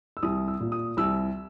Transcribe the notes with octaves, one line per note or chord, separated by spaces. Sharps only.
E6
C2 D#6
E6
A#2
D#6
C2 E6